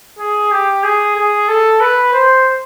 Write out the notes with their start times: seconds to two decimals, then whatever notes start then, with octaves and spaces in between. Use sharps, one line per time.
0.19 G#4
0.51 G4
0.84 G#4
1.16 G#4
1.48 A4
1.80 B4
2.13 C5